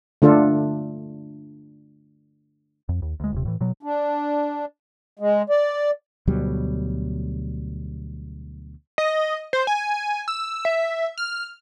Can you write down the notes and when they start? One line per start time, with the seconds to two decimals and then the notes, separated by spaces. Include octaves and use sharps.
0.22 D3 A3 D4 F4 A4
2.89 F2
3.02 D#2
3.20 D2 G#3
3.33 D#1 C3
3.45 A2 E3
3.61 B2 F#3
3.83 D4
5.19 G#3
5.49 D5
6.27 D2 B2 F#3 G3
8.98 D#5
9.53 C5
9.67 G#5
10.28 E6
10.65 E5
11.18 F6